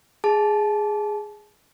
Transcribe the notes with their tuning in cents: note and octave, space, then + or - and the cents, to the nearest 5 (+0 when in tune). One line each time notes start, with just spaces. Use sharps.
G#4 +0 A5 -25